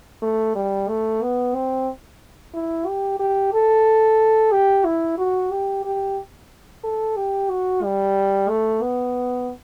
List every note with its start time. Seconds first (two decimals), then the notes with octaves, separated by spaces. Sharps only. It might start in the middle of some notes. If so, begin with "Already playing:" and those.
0.22 A3
0.55 G3
0.88 A3
1.21 B3
1.54 C4
2.54 E4
2.87 G4
3.20 G4
3.53 A4
4.52 G4
4.85 E4
5.18 F#4
5.51 G4
5.84 G4
6.84 A4
7.16 G4
7.50 F#4
7.83 G3
8.49 A3
8.82 B3